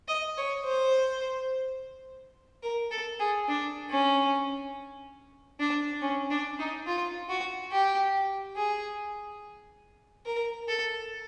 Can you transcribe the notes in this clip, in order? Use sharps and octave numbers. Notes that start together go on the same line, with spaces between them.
D#5
C#5
C5
A#4
A4
G#4
D4
C#4
D4
C#4
D4
D#4
F4
F#4
G4
G#4
A#4
A4